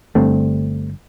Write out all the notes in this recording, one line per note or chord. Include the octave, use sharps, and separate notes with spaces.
G1 G2 D3 A3 C4